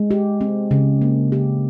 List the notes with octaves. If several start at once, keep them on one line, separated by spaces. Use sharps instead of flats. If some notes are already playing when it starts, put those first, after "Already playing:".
Already playing: G#3
G4
C4
C#3
A#3
G4